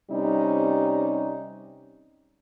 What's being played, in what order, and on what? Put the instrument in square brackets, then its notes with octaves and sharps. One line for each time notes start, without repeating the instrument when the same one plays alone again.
[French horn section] C3 G3 C#4 D#4